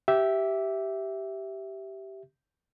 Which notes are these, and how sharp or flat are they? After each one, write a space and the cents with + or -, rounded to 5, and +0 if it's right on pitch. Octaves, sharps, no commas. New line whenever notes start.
G4 -15 E5 +0